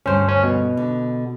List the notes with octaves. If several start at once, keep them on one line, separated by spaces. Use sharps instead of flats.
D2 G2 C#4 C5
C#4
B2
D3